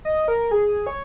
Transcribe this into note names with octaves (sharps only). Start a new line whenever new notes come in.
D#5
A#4
G#4
C#5